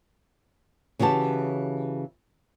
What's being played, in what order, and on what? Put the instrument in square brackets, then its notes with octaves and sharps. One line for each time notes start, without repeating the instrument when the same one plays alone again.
[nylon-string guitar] C#3 E3 F#4 G4 A5